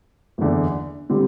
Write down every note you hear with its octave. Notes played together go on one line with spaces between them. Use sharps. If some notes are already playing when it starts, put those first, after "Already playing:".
F#1 E2 D3
D3 G3 C4